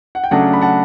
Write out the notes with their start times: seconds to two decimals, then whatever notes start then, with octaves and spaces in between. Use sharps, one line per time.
0.15 F#5
0.24 G5
0.31 C#3 F#3 A3 D4 F#5 A5
0.54 B5
0.62 F#5 A5